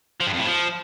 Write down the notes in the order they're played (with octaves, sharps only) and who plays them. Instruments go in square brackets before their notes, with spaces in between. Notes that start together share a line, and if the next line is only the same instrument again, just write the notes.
[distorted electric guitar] F3
G2
F2
A2
F3